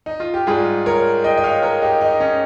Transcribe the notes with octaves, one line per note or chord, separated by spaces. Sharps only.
D#4
F4
G4
G#2 G3 F4 G#4
A#4 C#5
D#5 G5
D#5
C#5 F5
A#4 C#5
D#4 G4
D#4
C#4